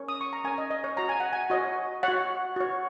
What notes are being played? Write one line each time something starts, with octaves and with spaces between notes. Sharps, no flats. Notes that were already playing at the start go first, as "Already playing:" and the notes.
Already playing: C#4 A#4 C#5
D#6
C#6
A#5
C#4 A#4 C#5 G#5
D#5
D#5
C#5
F#4 C#5 A#5
G#5
F#5
G#5
F#4 C#5 D#5
F#4 C#5 F#5
F#4 C#5